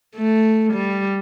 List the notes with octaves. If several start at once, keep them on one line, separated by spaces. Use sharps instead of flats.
A3
G3